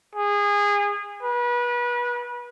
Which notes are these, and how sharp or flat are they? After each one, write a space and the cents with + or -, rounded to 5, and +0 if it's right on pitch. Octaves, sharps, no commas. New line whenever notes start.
G#4 -25
B4 -30